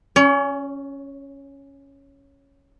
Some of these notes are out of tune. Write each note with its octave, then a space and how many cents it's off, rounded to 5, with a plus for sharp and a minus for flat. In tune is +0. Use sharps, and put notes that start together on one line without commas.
C#4 +0 C#5 +40